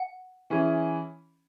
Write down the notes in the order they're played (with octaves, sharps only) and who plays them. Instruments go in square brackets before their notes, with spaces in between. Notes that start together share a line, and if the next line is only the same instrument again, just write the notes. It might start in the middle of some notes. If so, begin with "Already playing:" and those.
Already playing: [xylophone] F#5
[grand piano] E3 C#4 E4 G#4